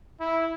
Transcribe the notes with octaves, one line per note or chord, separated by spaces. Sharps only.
E4